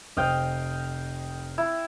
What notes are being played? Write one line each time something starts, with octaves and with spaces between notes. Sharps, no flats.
F1 C5 D#5 F5 G5 D#6
E4